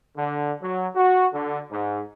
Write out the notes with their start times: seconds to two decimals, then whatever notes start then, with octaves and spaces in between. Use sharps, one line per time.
0.16 D3
0.62 F#3
0.96 F#4
1.34 D3
1.71 G#2